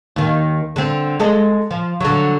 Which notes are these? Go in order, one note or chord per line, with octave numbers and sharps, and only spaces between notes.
D#2 D#3
D3 C4
G#3 A4 D#5
F3
D3 F#3